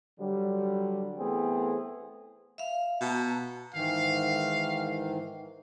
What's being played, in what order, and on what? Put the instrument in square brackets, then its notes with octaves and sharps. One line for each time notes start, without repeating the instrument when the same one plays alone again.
[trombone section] D3 F#3 G3
E3 A3 B3 C4 G#4
[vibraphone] E5 F5
[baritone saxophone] B2 [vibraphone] A5 A#5
[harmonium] G#2 D#3 E3 [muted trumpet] F5